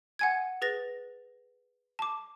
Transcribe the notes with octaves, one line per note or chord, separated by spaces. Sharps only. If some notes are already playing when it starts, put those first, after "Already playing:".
F#5 G#5 G#6
G#4 B4 A6 A#6
A5 D6